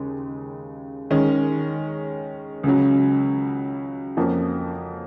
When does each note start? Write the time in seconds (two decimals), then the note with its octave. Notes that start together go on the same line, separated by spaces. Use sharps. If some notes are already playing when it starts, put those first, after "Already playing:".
Already playing: D#2 C#3 G#3
1.11 D#3 G#3 C#4
2.63 C#2 C#3 F#3
4.17 F2 F3 A#3 C#4 F#4